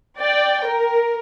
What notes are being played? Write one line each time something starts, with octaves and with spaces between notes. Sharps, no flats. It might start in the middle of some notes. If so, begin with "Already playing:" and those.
D5 G5
A#4